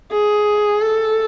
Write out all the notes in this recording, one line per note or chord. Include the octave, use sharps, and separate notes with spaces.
G#4
A4